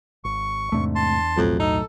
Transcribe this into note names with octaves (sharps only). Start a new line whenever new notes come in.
G#1 C#6
E2 G#2 C3 A3 D4
A5 C6
B1 F2 A2 F#3
D#4 A4